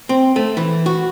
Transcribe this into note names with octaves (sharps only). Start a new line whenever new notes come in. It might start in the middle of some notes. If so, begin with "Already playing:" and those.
C4
A3
E3
F#4